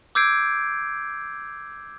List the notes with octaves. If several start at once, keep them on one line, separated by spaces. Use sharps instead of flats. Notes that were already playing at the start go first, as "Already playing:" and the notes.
D6 E6 G6 G#6 C7 D7